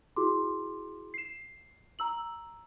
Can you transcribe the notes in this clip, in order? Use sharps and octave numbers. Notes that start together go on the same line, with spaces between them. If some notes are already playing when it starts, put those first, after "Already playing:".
E4 F#4 G#4 C6 D6
C7 E7
A#5 E6 F#7